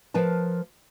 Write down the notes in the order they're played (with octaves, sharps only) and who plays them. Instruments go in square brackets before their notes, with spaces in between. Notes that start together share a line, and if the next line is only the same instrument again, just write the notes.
[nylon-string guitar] F3 A#4 B4 A5